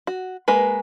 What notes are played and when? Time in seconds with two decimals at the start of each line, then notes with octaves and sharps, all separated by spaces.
0.07 F#4
0.48 G#3 A#3 B4